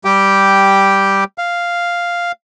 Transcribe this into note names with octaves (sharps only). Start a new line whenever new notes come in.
G3 G4 G5
F5